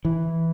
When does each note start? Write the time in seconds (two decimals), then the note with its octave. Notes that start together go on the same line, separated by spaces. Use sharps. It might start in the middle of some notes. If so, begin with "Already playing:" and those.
0.05 E3